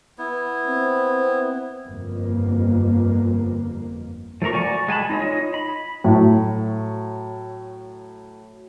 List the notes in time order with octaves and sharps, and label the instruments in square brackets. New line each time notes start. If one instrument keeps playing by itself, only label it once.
[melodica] B3 E4
[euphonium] C4
[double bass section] G1 F2 A#3
[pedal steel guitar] F3 A3 A#4 A#5 C#6
F#4 D5 G#5 A#5 C#6
G#3 G#5 A5 B5
D#4 F4 C#5 D#5
B5
[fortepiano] A2 F#3